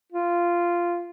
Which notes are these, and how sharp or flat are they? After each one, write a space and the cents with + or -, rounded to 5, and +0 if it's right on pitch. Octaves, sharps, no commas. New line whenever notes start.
F4 -10